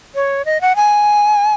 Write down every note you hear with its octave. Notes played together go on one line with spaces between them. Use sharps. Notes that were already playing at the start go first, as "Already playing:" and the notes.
C#5
D#5
F#5
G#5